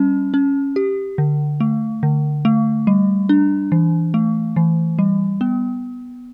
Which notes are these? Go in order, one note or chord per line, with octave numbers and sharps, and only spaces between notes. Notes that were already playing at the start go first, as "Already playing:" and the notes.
Already playing: G3 C#4
C#4
G4
D3
A3
D3
A3
G3
D4
E3
A3
E3
G3
B3